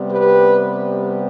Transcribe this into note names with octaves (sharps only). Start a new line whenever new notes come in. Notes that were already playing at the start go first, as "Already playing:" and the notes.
Already playing: C3 G3 B3
G4 B4